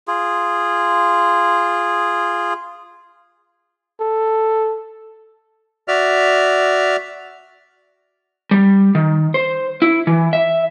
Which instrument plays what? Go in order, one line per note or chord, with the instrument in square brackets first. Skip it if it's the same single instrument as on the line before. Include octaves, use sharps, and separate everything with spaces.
[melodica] F4 G#4
[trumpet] A4
[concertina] F#4 D5 E5 F6
[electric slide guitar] G3
D#3
C5
E4
E3
E5